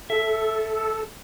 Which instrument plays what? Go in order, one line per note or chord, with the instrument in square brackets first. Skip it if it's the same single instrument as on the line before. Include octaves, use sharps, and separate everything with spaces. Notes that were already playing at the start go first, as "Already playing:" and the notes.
[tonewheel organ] A4 [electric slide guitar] E5